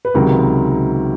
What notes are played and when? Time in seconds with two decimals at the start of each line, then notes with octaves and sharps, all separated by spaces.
0.05 B4
0.14 C#2 C3 D#3 F#3 A#4